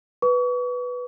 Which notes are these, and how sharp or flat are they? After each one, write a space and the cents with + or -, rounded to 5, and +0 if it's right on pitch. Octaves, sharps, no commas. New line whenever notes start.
B4 +0 C#6 +40